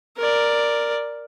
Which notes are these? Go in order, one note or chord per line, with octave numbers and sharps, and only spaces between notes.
A#4 D5